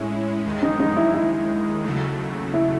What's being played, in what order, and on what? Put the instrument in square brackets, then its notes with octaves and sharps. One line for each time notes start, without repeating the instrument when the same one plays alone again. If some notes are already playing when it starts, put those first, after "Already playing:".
Already playing: [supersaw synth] A2 G#3 C#4 E4
D#2 D#3 G#3
[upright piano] D#4
D#4
E4
E4
[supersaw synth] D#2 C#3 F#3 A3
[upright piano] E4